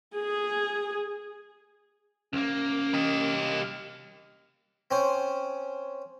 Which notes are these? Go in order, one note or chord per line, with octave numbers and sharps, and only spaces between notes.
G#4
C2 A#3 C#4
G4 D#5
C4 C#4 C5